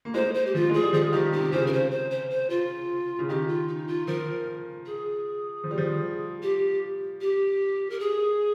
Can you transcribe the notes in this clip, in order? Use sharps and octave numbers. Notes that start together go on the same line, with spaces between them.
A#3
G#3 C5
C5
G4
F3 F4
G#3 G#4
G3
F3 G#4
D#3 G4
C3 G4
C#3 C5
A#4
C5
C5
C5
C5
F4
C#3
D#3 G4
F4
D#4
F4
F3 A#4
G#4
F3
G3
F3
G4
G4
A#4
G#4